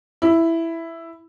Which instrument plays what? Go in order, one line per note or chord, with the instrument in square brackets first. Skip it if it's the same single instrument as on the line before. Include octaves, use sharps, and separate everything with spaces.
[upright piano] E4